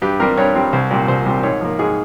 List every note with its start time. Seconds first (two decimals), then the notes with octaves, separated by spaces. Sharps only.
0.02 G2 G4
0.20 G3 C4 A#4
0.38 G2 C#5
0.55 G3 C4
0.73 C2 C5
0.91 A#2 G3 C4
1.08 C2 C5
1.26 A#2 G3 C4
1.43 G#2 C#5
1.61 F3 A#3
1.79 G#2 G#4